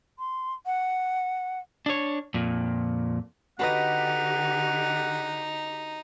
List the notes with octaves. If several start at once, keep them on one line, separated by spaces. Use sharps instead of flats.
C6
F#5
D4 C#5
F2 A#2
D3 D#4 F#4 G4 B4 D#5 F#5